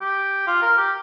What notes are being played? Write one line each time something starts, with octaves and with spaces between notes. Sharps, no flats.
G4
F4
A#4
G4